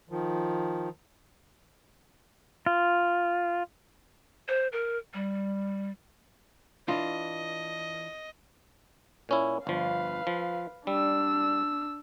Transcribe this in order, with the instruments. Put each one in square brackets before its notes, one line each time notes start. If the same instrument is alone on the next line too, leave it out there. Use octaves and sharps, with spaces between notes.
[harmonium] D#3 F3
[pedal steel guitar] F4
[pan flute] C5
A#4
G3
[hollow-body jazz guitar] E3 D4 F4 [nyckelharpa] D#5
[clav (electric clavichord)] A#2 C#4 E4
[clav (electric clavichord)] G1 F3 [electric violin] B4 F5
[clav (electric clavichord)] F3
[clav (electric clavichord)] G3 [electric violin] D4 E6